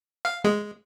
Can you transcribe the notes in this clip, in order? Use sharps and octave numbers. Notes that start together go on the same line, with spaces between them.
F5
G#3